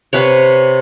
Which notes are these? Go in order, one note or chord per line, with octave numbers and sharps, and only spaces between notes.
C3 B4 C#5